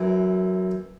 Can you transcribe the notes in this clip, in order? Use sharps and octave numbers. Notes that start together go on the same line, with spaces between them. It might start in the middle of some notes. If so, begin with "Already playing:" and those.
Already playing: F#2 E3